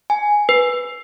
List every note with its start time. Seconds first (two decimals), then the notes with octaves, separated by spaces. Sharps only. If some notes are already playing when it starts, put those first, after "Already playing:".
0.10 G#5
0.49 B4